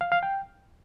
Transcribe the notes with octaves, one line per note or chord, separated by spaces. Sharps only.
F5
F5
G5